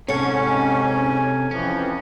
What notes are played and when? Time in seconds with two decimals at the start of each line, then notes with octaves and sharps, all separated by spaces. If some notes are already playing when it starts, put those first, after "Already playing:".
0.08 G#2 C3 C#4 A4 C#5 F#5 G#5
1.51 F2 E3 F3 C#4